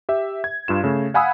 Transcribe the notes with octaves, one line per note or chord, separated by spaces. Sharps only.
G4 E5
G#6
G2 F4 E7
C#3 A3
F5 F#5 G#5 B5 D#6 E6